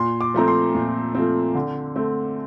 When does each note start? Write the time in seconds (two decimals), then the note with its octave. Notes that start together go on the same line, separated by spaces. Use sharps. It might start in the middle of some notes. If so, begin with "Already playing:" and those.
Already playing: A#2 C6
0.21 D6
0.34 F3 A3 C4 A#5
0.48 C6
0.75 A#2
1.15 F3 A3 C4
1.55 D3
1.96 A3 C4